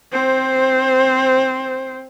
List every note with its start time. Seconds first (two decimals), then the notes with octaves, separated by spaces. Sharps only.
0.12 C4 C5